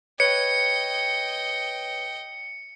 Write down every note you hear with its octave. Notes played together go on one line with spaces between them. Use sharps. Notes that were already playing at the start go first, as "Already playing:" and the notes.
B4 C#5 D#5 G5 C#7